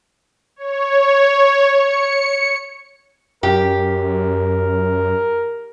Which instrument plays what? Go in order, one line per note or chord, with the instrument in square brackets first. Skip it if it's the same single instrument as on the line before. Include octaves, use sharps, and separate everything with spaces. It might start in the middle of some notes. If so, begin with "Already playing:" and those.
[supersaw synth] C#5
C#7
[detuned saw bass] F#2 [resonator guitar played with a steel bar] G4 [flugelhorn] A#4